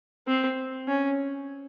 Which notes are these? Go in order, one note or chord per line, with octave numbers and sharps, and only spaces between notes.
C4
C#4